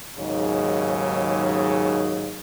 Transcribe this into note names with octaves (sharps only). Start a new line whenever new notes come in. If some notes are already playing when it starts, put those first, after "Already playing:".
D#2 G#2 C#3 F#3 D#4